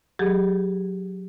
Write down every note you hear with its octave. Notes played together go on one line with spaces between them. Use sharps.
F#3 G4 G#4